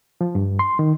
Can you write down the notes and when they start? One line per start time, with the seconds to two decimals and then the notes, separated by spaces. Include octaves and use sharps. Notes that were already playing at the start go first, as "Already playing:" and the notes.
0.21 F3
0.35 G2
0.59 C6
0.79 D#3